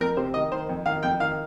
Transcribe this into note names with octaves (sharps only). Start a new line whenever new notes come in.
F2 A#4
C3 C5
D#3 D#5
D#3 C5
F2
D#3 F5
F2 G5
D#3 F5